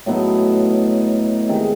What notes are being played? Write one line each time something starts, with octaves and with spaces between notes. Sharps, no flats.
A2 F#3 B3 D#4
C3 D#3 G#3